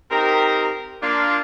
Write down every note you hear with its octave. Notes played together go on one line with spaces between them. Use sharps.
C4 D#4 G4 A#4
A#3 D4 F4